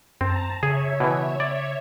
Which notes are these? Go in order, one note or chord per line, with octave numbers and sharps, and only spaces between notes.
F#2 C4 A5 A#5
C#3 G#4 C#5 E5 G#6
B2 E3
D5